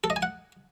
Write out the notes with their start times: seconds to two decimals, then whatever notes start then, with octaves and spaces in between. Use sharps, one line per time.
0.04 A4
0.10 D#5
0.16 G#5
0.22 F#5